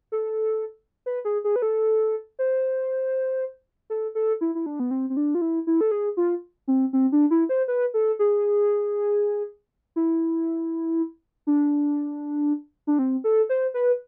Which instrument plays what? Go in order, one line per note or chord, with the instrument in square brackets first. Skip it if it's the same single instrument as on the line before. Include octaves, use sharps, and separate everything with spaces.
[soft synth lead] A4
B4
G#4
G#4
B4
A4
C5
A4
A4
E4
E4
D4
B3
C4
C4
D4
F4
E4
E4
A4
G#4
F4
C4
C4
D4
E4
C5
B4
A4
G#4
E4
D4
D4
C4
A4
C5
B4